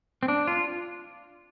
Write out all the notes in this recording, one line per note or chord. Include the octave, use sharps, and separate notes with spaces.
C4
D4
F4